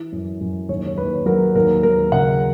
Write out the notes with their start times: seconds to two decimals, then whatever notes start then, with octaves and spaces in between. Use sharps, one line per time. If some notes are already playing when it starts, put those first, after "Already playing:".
Already playing: E3
0.12 F#2
0.41 F#2
0.69 D#2 C#5
0.87 C#5
0.98 D#2 B4
1.26 F#3 A#4
1.55 D#2 A#4
1.83 D#2 A#4
2.12 C#3 F#5